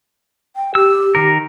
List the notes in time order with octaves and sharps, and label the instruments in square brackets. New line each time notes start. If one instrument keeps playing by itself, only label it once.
[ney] G5
[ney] G4 [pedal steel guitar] E6
[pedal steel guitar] D#3 A#4